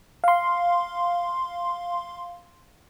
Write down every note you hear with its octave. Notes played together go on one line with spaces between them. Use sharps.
F5 C6